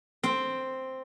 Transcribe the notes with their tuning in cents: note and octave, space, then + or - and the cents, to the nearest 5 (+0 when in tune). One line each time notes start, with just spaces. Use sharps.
C4 +0